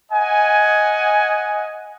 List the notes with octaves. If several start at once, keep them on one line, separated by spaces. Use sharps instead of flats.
D#5 F#5 G#5